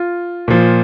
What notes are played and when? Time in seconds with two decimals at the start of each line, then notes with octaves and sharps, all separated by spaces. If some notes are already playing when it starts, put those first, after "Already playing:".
Already playing: F4
0.48 A#2 F3